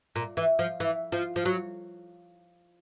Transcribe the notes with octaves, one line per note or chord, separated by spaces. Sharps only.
A#2
E3
F3
E3
F3
F3
F#3